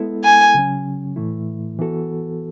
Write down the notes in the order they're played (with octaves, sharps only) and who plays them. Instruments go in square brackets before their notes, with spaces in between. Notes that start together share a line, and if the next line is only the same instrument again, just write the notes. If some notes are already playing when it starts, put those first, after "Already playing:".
Already playing: [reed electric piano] G#3 B3 E4 A4
[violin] G#5
[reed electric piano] C#3 F#3 C#4
A2 E3 A3 E4
E3 B3 F#4 A4